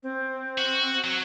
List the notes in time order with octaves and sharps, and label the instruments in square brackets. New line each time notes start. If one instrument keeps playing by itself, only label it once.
[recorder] C4
[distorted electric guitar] F#4
F#3